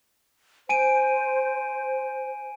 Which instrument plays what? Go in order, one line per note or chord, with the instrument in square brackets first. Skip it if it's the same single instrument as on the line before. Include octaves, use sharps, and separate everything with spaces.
[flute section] C5 [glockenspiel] G#5 D7 D#7